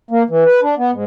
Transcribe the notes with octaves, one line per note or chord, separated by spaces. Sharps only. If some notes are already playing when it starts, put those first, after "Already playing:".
A#3
E3
B4
D4
B3
G#2